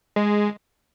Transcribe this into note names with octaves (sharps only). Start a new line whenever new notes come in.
G#3